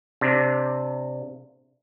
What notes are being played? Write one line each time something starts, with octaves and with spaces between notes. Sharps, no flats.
C3 D4